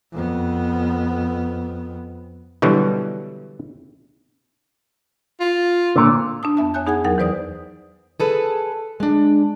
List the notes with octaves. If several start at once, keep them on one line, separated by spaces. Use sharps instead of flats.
F2 B3
B2 D3 E3 F#3 G3
F4
A#2 D3
D4 A5 D#6
F2 B3 E5 A5
C#5 E5 G#5 F#6 G6
B3 D#4 G#4 F#5 G#5 G#6
E2 F#3 D#4 A#4 F#5
E3 B4 C5 D5 D#6
G#4 A4 B4
G#3 D4